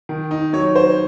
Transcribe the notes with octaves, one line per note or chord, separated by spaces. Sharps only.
D#3
D#4
F#3 C#5
C5